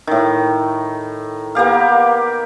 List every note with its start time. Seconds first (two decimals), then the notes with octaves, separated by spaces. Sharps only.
0.07 A2 D#3
1.55 A#3 B3 G4 F5